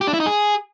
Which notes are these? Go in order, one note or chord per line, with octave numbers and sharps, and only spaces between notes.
G4
D4
E4
D#4
G#4